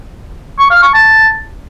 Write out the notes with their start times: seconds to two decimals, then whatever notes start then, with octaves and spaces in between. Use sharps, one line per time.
0.59 C#6
0.71 F5
0.82 C#6
0.94 A5